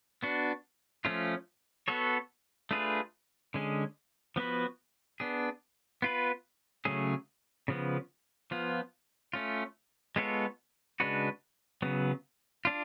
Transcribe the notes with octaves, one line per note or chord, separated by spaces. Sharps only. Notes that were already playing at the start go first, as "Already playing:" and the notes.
B3 D4 F#4
F3 A3 C#4 F4
B3 F#4 A4 C#5
A3 D4 F4 G#4 B4
D3 G#3 C#4 G#4
F3 B3 F#4 B4
B3 D4 G#4
B3 F4 B4
C#3 F#3 A3 C#4 G#4
C#3 F3 B3
F3 B3 F4
A3 C#4 F4
G#3 B3 F4 A4 C#5
C#3 G#3 D4 F#4 B4
C#3 F#3 B3
D4 F4